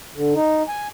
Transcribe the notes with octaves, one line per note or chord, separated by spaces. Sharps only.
D3
D#4
G#5